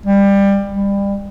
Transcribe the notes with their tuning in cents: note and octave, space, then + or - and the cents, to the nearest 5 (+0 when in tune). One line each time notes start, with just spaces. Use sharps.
G3 +20
G3 +30